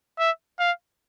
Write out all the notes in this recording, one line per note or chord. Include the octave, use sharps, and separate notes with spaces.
E5
F5